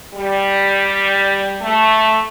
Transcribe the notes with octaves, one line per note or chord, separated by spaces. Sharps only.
G3
A3